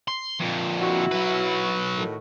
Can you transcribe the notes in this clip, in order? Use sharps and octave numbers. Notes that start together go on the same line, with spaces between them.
C6
F2 A#2
E4 F#4
F#3 B4
A2 D#3 F#4